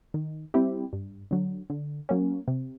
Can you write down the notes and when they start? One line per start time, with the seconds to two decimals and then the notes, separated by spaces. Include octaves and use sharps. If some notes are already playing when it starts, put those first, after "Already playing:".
0.14 D#3
0.54 G3 C4 E4 G4
0.93 G2
1.31 D3 F#3
1.70 D3
2.09 F#3 A#3 C#4
2.48 C3